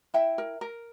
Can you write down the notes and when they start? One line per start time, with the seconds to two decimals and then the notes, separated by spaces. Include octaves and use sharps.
0.14 E4 E5 G5
0.38 A#4
0.61 A#4